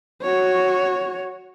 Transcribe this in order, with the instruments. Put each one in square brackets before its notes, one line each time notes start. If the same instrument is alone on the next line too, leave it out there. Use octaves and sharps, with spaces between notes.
[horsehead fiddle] F#4 C#5